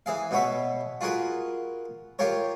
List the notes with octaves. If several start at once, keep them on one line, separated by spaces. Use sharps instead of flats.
E3 G#4 F5
B2 B3 C#5 E5
F4 F#4 G#4 A#4 B4
F4 G4 A#4 C#5